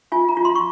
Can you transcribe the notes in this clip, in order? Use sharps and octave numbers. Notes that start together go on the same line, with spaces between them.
F4 G#5
A#5
F4
C6
C#6